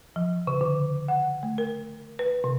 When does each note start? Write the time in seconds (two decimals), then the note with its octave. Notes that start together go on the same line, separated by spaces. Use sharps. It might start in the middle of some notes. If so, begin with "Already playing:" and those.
0.16 F3
0.47 C#3
0.61 D3
1.08 F#5
1.43 A3
1.58 A#4
2.19 B4
2.44 C3